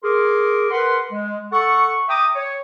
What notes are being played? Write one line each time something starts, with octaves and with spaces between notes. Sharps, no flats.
G#4 A#4 C6 D6
A#4 B4 F#5 C6
G#3
A4 F#5 C#6
E5 G5 A#5 D6 D#6
C#5